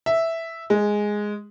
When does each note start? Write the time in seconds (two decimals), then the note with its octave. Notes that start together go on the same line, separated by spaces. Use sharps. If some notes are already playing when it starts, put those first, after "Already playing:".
0.06 E5
0.70 G#3